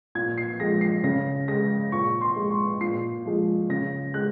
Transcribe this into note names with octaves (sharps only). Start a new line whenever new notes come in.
A#2 G#6
C7
F3 G#3 A#6
C7
C#3 A#6
G#3 A#6
A#2 C#6
C6
G#3
C#6
A#2 C7
F3 G#3
C#3 A#6
G#3 F#6